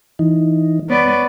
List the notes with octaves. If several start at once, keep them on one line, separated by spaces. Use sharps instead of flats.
E3 D#4
B3 C#5 D5